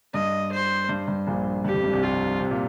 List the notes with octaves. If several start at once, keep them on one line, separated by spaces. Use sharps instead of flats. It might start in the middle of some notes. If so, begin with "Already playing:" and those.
G2 D#5
C5
G2
G2
A#1 A#2
G2 G4
F2
G2
C2 C3
F4
C3
A#2